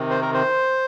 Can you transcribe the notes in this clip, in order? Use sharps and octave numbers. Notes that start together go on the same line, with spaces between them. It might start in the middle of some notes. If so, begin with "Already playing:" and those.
Already playing: C3 D#3
C5
A#4
C5